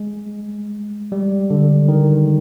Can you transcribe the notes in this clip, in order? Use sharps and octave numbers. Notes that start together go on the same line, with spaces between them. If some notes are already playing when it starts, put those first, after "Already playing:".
Already playing: G#3
G3
D3
D#3